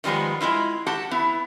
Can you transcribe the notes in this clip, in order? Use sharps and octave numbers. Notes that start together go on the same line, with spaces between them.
D#3 F3 G3 G#3 B3
G#3 C#4 E4 F4
F#4 G4 F#5 A5
B3 E4